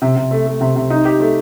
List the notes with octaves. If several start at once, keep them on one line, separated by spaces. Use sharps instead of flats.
C3
C3
A3
A3
C3
C3
D#4
G4
A3